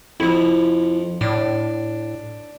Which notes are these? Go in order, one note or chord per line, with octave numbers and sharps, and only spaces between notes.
F2 F3 E4
A2 D4